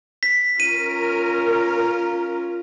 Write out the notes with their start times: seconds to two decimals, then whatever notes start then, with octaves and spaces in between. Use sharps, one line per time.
0.23 B6
0.60 C#4 F4 A#4 D#7